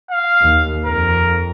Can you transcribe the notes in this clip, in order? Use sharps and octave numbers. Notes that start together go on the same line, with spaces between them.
F5
D#2
F2 A#4